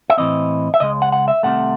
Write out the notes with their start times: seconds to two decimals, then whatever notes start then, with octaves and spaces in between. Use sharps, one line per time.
0.10 E5
0.17 A2 E3 C4 D#5
0.74 E5
0.80 C#2 C#3 G#3 D#5
1.02 F#5
1.12 F#5
1.28 E5
1.43 C2 C3 D#3 A3 F#5